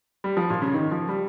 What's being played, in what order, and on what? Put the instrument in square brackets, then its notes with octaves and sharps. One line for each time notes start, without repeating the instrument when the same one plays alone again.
[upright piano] G3
F3
A#2
C#3
D#3
F3
G3